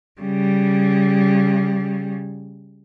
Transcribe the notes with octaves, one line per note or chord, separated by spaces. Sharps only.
C#3 G3